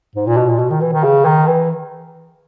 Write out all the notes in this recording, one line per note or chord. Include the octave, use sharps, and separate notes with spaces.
G#2
A#2
B2
A#2
B2
D#3
E3
D#3
C#3
D#3
E3